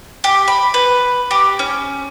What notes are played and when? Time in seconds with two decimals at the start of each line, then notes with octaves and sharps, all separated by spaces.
0.24 G4
0.48 B5
0.74 B4
1.31 G4
1.59 C#4